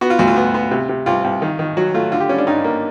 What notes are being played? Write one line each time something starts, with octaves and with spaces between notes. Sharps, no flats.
B3 F#4
F4
D2 F#4
F4
B3
B3
C3
C3
C2 F4
C2
D#3
D#3
F#3 F#4
A3 F4
D3 F4
G4
G3 C#4
D4
G2 D#4
A#3